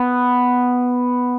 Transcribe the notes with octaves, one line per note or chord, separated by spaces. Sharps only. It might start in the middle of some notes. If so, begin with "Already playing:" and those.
Already playing: B3